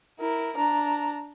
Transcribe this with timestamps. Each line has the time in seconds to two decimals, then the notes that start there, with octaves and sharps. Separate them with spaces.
0.20 E4 A#4
0.57 D4 A#5